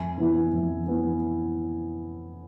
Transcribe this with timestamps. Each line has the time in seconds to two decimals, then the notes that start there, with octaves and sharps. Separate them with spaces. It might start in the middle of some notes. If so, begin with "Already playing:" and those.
Already playing: F2 E5 G#5
0.18 E3 B3 E4
0.53 F2
0.86 E3 B3 E4